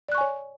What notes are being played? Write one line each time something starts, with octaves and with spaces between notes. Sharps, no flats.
C#5 D5 G#5 C#6 F#6